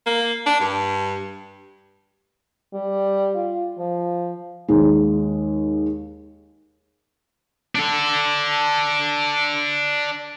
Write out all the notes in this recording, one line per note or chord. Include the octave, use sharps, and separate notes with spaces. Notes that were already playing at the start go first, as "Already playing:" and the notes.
A#3
D4
G2
G3
F4
F3
D#2 G#3
D4 A4